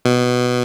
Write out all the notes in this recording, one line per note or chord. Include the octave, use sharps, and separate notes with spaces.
B2